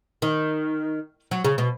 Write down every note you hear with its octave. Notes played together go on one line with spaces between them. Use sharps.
D#3
F#3
C#3
B2